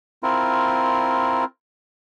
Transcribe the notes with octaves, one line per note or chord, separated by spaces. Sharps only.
C4 E4 F4 A#4